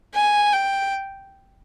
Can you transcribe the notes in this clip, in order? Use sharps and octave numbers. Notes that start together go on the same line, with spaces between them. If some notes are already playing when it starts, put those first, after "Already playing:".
G#5
G5